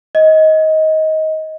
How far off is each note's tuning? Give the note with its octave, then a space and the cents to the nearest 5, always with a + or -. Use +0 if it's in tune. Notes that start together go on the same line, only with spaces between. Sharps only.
D#5 +20